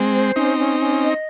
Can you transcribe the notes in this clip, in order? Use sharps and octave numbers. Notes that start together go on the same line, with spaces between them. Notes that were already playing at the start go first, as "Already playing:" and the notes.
Already playing: G#3 C4
C5
C4 C#4 D#4
C#4
C#4
D#5